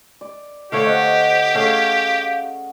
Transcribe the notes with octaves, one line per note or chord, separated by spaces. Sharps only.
D5
D3 A3 G4 C#5 F5
C5 D#5 F#5
A3 C#4 G#4 F5